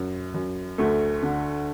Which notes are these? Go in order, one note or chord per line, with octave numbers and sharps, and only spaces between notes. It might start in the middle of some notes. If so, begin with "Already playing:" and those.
Already playing: F#2
F#2
D2 A3
D3